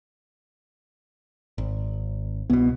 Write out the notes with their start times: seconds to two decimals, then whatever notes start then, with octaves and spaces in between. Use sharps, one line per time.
1.58 G#1
2.50 C2 B2 B3